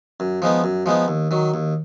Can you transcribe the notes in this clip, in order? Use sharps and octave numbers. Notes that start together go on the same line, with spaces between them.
F#2
F3 G#3 B3 D#4
F#2
F3 G#3 B3 D#4
D#2
D#3 F#3
D#2